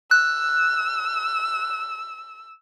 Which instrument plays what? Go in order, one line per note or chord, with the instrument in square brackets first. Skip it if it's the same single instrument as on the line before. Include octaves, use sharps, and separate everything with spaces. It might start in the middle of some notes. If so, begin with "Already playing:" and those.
[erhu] E6 [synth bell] F#6